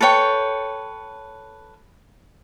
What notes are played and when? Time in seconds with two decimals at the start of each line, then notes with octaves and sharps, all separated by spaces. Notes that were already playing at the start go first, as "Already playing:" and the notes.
0.01 A4 B4 C#5 G5